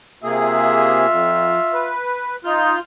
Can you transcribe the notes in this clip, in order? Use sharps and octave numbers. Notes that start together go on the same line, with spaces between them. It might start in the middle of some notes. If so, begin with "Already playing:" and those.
C3 A#3 F4 G#4 E5
F2
B4
D#4 F4 F6 G6